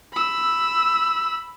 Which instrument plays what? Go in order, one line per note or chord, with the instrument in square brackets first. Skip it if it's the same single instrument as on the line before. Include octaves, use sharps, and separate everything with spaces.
[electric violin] B5 E6